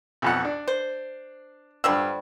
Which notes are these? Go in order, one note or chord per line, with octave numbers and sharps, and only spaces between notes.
B1 F2 F#5
D4
C5
G2 D3 F3 G3 E6